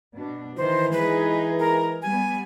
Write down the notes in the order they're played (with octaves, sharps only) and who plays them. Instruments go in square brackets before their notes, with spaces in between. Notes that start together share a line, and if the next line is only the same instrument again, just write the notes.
[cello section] B2 D4
[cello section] D#3 [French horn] E3 [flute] C5
[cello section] G#3 D#4 G#4 [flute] B4
[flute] A#4
[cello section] G3 B3 [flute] G#5